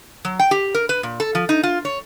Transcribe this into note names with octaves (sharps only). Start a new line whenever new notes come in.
F#3
G5
G4
A#4
B4
A#2
A4
F3
D#4
F4
C#5